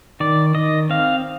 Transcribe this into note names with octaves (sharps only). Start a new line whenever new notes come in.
D#3 D5
D#3 D#5
C4 F5